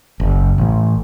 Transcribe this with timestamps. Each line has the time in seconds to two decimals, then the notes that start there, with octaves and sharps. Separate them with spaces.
0.20 F#1
0.58 A1